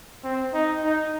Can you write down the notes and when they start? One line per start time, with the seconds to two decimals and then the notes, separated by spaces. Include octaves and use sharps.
0.24 C4
0.54 D#4
0.84 D#4